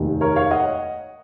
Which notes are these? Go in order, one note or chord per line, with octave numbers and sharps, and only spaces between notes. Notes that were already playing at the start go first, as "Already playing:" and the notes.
Already playing: F1 D#2 D#3
A#4 C#5
C#5 F5
D#5 F#5